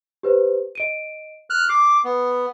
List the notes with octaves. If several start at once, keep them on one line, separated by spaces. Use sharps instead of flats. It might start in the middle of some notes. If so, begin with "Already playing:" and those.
G4 B4 C5
D#5 D7 D#7
F6 F#6
D6 C7
B3